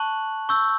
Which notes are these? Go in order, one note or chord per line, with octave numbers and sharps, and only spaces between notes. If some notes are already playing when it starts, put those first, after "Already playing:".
Already playing: A5 C#6 F#6 F#7
C#6 E6 G6